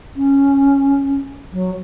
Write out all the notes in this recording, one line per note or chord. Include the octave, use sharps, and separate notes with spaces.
C#4
F#3